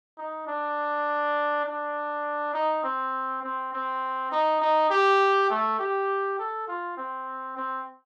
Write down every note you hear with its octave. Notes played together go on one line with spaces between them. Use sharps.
D#4
D4
D4
D#4
C4
C4
C4
D#4
D#4
G4
A3
G4
A4
F4
C4
C4